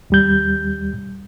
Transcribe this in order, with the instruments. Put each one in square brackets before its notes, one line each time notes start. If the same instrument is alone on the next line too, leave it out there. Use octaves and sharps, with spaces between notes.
[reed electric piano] D#2 G3 G6